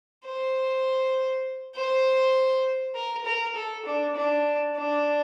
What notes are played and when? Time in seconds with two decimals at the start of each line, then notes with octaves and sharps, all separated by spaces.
0.24 C5
1.75 C5
2.95 A#4
3.25 A#4
3.55 A4
3.85 D4
4.15 D4
4.76 D4